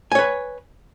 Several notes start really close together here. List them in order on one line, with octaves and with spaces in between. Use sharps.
G#5 C#5 B4